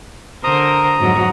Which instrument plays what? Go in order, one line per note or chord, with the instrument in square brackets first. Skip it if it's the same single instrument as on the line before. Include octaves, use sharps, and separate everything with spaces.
[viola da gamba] D3 A#4 C5 [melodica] A#5 D#6
[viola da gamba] F2 G#2 F#3